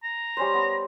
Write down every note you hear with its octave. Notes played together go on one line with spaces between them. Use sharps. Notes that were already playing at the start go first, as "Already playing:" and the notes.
A#5
G3 C#4 C5
B3 C5